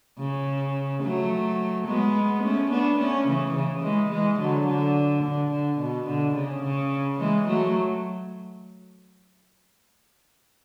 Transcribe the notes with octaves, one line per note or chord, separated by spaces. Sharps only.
C#3
F#3 A3
G#3 B3
A3 C#4
B3 D4
A3 C#4
C#3 E3
C#3
E3 G#3
E3 G#3
D3 F#3
D3
D3
D3
B2
D3
C#3
C#3
E3 G#3
F#3 A3